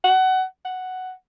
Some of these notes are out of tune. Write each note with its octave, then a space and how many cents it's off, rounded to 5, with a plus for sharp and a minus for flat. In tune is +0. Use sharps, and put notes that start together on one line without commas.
F#5 +20
F#5 +5